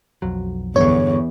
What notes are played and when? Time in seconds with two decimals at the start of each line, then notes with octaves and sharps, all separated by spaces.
0.22 B1 F2 F#3
0.76 E2 G2 D3 C#5